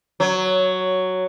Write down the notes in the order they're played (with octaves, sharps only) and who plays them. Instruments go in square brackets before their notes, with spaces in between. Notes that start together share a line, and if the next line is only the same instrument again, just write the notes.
[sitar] F#3